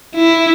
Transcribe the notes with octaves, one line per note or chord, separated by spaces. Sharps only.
E4